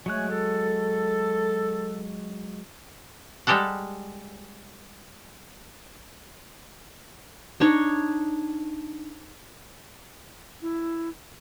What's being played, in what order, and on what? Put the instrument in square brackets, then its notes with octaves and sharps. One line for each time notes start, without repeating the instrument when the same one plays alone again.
[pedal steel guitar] F#3 G#3 F#6 [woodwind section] A3 C#5 G#5
[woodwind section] A4
[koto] G3 G#3 G4 A4 F#5
[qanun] D4 D#4 C#5
[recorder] E4